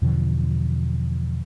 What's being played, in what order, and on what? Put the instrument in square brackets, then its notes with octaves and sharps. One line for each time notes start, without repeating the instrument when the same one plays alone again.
[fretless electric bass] E2 B2 D3 F3